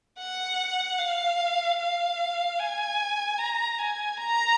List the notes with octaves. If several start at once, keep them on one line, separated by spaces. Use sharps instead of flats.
F#5
F5
F5
G#5
A#5
G#5
A#5